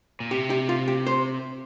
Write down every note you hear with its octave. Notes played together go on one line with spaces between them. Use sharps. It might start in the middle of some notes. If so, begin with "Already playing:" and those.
A#2
C3 G4
G4
F4
G4
C5